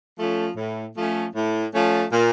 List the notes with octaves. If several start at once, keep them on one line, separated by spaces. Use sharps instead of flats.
F3 A3 C#4
A2
F3 A3 C#4
A2
F3 A3 C#4
A#2